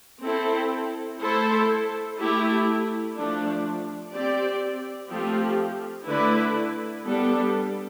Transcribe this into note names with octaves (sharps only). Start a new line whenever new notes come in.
C4 E4 A4
A3 E4 A4 C5
A3 E4 G4
F3 A3 D4
C4 G4 D5
F3 A3 C4 G4
D3 A3 E4 B4 D5
G3 B3 D4 A4